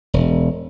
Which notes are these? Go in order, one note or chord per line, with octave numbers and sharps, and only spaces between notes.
E1